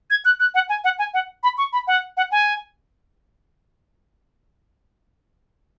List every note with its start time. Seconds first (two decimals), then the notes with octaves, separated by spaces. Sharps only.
0.10 G#6
0.25 F#6
0.40 F#6
0.55 F#5
0.69 G#5
0.84 F#5
0.99 G#5
1.14 F#5
1.43 B5
1.58 C#6
1.73 B5
1.87 F#5
2.17 F#5
2.32 G#5